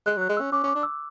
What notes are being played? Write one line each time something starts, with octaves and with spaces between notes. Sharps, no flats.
G#3 F#6
F#3
F#6
G#3
E6
C#4
C#4 D6
C#4
D6
D4
E6